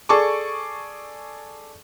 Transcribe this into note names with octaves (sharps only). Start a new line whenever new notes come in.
G#4 A4 D5 A5 C#6 D6